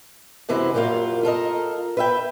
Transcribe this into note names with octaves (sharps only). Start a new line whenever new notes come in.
F#2 C3 E3 G#3 E4
F#2 A#2 G3 A#3 F4
F4 A4 A#4 D#5
B4 E5 G5